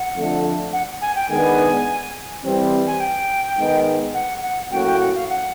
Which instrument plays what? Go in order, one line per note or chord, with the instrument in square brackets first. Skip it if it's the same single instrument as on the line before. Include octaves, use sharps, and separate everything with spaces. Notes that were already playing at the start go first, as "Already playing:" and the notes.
Already playing: [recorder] F#5
[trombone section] F2 D3 F3 A3 D4
[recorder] F#5
G#5
G5
[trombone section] D#3 G#3 B3 D4 [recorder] G#5
[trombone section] E3 G3 C4
[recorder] G#5
G5
[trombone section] G#2 D#3 G#3 B3 D#4
[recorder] F#5
F#5
[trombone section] A2 F#3 A#3 C#4 F#4 [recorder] G5
[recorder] G5
F#5
F5
F#5